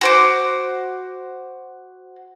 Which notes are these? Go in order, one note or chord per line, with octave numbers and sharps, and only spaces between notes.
F#4 C5 D6